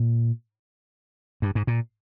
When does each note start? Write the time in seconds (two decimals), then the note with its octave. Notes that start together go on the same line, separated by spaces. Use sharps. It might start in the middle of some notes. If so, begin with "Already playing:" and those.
Already playing: A#2
1.42 G2
1.55 G#2
1.67 A#2